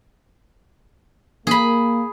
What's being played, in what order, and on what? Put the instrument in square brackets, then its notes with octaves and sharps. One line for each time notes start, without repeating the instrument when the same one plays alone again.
[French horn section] A#3 [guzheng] G#4 B5